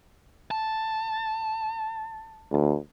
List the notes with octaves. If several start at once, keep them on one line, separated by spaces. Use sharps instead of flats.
A5
D2